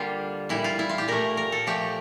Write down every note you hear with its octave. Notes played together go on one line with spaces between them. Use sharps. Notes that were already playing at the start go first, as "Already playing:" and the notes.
Already playing: D3 G3 A#3 F4 G4
A#2 G3 E4
F4
E4
F4
G4
A#2 A3 A#4
A#4
A4
A#2 F3 A3 G4